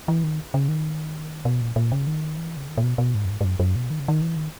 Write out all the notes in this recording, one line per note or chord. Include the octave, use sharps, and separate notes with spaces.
E3
D#3
C#3
D#3
B2
A#2
A#2
C#3
D#3
E3
C#3
D#3
A#2
B2
B2
G#2
F#2
G#2
G#2
F#2
F#2
B2
D#3
C#3
D#3
E3
D#3